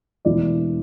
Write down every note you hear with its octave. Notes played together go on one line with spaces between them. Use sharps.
E1 E2 E3 A3 D5